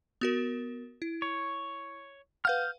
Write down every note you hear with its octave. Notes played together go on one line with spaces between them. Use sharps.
B3 F#4 A#4
E4
C#5
B4 F5 F#5 F6 G6